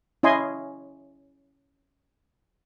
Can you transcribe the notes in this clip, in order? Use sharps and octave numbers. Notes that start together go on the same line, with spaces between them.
C#4 E4 D#5 G#5 C6